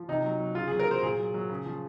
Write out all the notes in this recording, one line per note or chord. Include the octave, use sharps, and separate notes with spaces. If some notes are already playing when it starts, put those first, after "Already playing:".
Already playing: F3
C3 D#4
F#3
F#3
C#3 F4
G#4
F#3
A#4
F#3 C5
A#2 G#4
F#3
F#3
C#3
F3